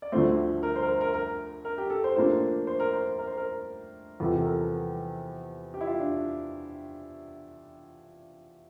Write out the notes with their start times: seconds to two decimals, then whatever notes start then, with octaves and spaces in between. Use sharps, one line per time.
0.02 D5
0.12 D2 D3 F3 A3 C5
0.63 A#4
0.76 C5
0.82 A#4
0.88 C5
1.01 A#4
1.14 A#4
1.65 A#4
1.78 G4
1.90 A4
2.04 C5
2.16 A2 F3 A#3 D4 C5
2.67 C5
2.80 A#4
2.93 C5
3.18 A#4
3.27 C5
3.37 A#4
4.20 E2 C3 F3 A4
4.42 A4
4.45 A#4
5.74 G4
5.81 E4
5.86 F4
5.99 D4